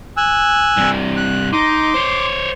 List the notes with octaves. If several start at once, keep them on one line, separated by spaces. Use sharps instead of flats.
G#5 E6 F#6
G2 C3
F#6
D#4 C6 D6
C5 C#5